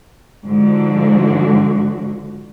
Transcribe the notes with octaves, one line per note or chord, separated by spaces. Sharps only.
G#2 D3 F3 F#4